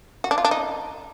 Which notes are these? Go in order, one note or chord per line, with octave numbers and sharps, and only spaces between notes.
F#4
D4
F4
D4
D#4